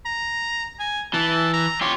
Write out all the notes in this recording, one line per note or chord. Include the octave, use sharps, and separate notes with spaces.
A#5
G#5
E3 A5
A#5
F4 G4 C#5